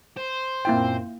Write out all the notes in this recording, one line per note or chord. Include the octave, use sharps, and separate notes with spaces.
C5
F#2 A#2 A#3 C4 E4 G5